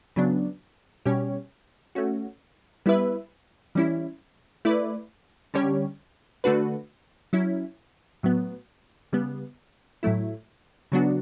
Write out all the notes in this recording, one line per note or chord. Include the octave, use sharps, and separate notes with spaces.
C#3 F#3 B3 D4
B2 G3 C#4 G4 C#5
A3 C#4 F#4
G3 B3 E4 B4 E5
E3 G3 C#4 E4
A3 E4 B4 D5
D3 G3 C#4 G4 C#5
D3 A3 D4 F#4 B4
F#3 C#4 E4
A2 F#3 B3
C#3 G3 B3
A2 F#3 A3 E4
C#3 F#3 B3 D4 F#4